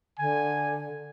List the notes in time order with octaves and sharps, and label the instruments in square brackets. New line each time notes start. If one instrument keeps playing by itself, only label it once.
[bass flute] D3 [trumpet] G#5